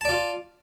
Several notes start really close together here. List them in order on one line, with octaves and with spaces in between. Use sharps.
A5 D5 F4